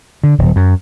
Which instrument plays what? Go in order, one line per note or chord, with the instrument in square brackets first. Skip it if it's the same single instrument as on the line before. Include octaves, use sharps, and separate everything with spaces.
[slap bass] D3
D#1
F#2